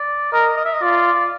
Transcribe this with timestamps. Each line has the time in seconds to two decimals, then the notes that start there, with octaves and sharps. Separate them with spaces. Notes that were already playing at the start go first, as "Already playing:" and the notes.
Already playing: D5
0.33 A#4 D#5
0.57 D#5
0.65 E5
0.73 D#5
0.82 F4 D5